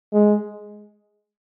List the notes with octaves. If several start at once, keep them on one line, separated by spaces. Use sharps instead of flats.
G#3